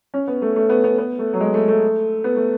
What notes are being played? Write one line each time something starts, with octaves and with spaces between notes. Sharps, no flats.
C#4
B3
A3
A3
B3
B3
B3
A3
F#3
G#3
A3
A3
B3
A3